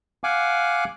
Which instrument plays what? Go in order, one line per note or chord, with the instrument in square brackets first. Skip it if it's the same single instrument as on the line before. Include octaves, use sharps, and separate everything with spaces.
[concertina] F5 F#5 G#5 D6